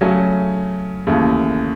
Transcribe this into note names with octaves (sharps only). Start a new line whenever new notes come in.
C#3 F#3 A3 C#4
D#2 C#3 E3 A3